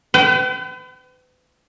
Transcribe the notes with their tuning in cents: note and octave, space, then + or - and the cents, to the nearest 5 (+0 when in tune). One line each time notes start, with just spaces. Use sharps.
B4 +40 G5 -30